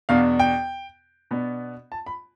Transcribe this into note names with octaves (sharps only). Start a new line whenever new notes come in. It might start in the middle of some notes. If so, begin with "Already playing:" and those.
E2 B2 B3 D4 F5
G5
B2 B3 D4
A5
B5